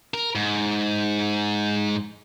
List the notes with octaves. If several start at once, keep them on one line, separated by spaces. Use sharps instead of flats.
A#4
G#2